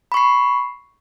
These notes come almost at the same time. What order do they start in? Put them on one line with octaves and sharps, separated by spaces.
B5 C#6 C7